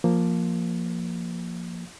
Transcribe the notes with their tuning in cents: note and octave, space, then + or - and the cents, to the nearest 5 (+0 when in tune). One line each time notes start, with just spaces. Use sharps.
F3 +0 A#3 +0